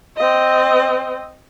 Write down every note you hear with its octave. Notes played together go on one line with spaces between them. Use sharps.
C4 D#5